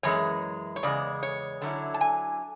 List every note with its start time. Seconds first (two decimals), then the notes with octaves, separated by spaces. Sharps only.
0.03 F#2 E3 G#3 C#5
0.76 C#5
0.83 E2 C#3 G#3 D5
1.23 C#5
1.62 D3 F#3 C#4 E4
1.94 A5
2.01 G#5